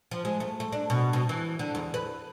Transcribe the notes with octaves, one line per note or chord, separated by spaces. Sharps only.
F3
G#3
A3
A3
D4
B2
B2
E3
D3
E2
B4